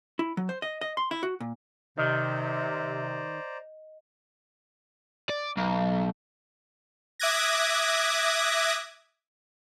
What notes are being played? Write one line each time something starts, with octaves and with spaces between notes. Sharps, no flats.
E4
F#3
C5
D#5
D#5
C6
E4
F#4
A#2
C3 D#3 C5 D5 D#5 A#5
D5
B1
E5 D6 D#6 F#6 G#6 A#6